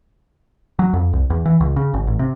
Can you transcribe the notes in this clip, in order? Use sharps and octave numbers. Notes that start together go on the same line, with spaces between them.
F#3
F2
C2
E2
E3
C#2
C#3
G#1
A1
C3